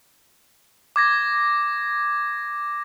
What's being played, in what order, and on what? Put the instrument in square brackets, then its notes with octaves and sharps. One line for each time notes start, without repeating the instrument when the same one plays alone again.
[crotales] D6 G#6 A#6